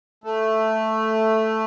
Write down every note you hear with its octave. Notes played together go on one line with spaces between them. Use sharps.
A3